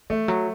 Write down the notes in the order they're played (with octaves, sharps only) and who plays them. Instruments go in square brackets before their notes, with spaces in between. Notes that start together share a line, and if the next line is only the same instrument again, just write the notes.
[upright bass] E3 [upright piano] A3
[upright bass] F#3